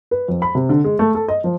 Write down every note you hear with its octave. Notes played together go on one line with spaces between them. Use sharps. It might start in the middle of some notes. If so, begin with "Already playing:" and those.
B4
F2
B5
C3
D3
G#3
A3
A4
D#5
F3